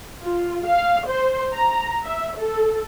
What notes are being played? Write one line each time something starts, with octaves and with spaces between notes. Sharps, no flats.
F4
F5
C5
A#5
E5
A4